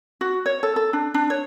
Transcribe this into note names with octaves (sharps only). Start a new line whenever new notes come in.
F#4
C#5
A4
A4
D4
D4
C#5